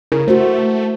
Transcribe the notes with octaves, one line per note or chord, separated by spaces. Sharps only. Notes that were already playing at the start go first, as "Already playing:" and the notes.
C#3 E4 A#4
A3 F#4 C5